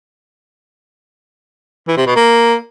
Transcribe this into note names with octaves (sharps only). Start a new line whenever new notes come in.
E3
C3
B2
A#3